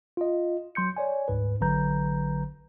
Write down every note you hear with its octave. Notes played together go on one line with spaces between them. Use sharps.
F4 D#5
F#3 C6 G6 C#7
C#5 D5 G#5
D2 G#2 B4
A1 D3 F#3 B4 A#5 G6